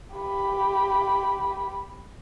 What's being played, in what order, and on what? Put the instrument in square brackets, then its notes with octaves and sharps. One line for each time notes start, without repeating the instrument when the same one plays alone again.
[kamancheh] G4 B5